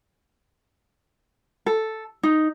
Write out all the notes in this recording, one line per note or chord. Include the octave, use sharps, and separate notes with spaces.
A4
D#4